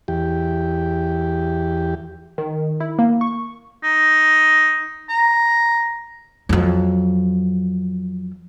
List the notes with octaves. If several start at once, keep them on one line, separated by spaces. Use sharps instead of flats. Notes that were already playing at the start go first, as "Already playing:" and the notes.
E2 G4
D#3
E4
A#3
C#6
D#4
A#5
F2 F#3